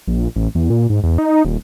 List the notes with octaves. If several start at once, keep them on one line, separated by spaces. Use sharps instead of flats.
A#1
A1
E2
A#2
G#2
E2
D#4
D#1